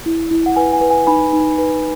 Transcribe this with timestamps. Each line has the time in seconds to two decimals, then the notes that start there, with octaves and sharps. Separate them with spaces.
0.06 E4
0.31 E4
0.46 F#5
0.56 B4 G#5
0.73 G#5
0.81 B4
0.91 G#5
1.07 D#4 G#5 B5
1.33 D#4
1.58 B4